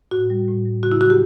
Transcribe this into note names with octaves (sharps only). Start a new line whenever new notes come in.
A2 F#4
G3
A2
G3
C#3 F#4
E4
F#3 F#4
G4